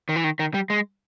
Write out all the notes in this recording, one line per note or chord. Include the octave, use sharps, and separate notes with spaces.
D#3
E3
D#3
D#3
G3
G#3